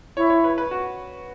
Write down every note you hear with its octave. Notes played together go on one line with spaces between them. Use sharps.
E4 C#5
C#5
B4
B4
F#4